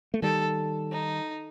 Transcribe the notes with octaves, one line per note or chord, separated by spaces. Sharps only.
A3
D#3 G3 A4
D#4